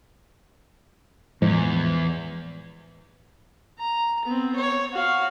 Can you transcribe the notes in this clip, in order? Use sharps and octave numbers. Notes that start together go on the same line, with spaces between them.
E2 A2 F3 G#3
A#5
B3 C4
C#5
F#4 F5